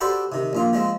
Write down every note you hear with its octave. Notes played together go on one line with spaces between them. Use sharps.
F#4 G4 A4 B4 C5 D5
C3 D#3
A#1 A#2 F4
F3 G#3 C4